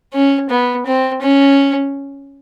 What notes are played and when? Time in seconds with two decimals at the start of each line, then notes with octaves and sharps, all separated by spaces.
0.13 C#4
0.50 B3
0.87 C4
1.22 C#4